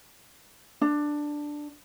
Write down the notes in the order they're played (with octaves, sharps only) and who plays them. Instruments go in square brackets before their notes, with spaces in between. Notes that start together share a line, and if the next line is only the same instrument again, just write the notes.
[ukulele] D4